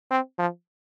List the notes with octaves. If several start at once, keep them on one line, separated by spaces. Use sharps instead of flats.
C4
F3